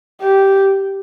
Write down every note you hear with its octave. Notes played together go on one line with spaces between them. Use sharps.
G4